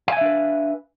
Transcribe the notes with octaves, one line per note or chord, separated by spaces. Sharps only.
D4 B4 E5 F5 G#5